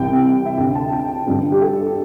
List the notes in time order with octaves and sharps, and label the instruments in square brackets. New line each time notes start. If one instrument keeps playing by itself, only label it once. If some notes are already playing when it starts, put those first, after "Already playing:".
Already playing: [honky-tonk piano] C2 C3 E3 G5
E5
D2 D3 G5
A5
G5
G1 G2 D3
G4
A4